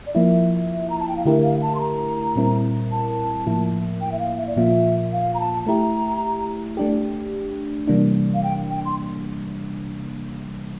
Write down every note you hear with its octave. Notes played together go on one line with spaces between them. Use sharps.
D5
F3 A#3 E4 E5
A#5
A5
G5
F5
D3 A3 E4 G4 A#4 E5
F5
A5
C6
A#5
A#2 G3 C4 E4 A#4
A5
A2 F3 A#3 E4
G5
E5
F5
E5
D5
A#2 F3 A#3 F4 E5
F5
A#5
A5
A3 E4 G4 A#5
A3 D4 G4
C3 E3 G3 A#3 D4
F5
G5
G5
C6